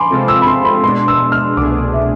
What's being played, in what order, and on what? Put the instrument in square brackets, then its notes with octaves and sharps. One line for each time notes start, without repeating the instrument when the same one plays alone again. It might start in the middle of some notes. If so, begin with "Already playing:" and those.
Already playing: [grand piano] G#5 B5 C6 D6
[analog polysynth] C3 G#3 C4 F4 A4
[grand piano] E6
B5
C6
B5
[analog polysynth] B2 G#3 D4 [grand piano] C6
[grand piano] E6
F6
[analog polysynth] C2 B2 A3 D4 G#4 [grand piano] D6
[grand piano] E5